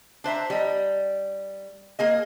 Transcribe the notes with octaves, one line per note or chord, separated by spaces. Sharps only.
D4 C5 E5 A#5
G3 D#5
A#3 G#4 D#5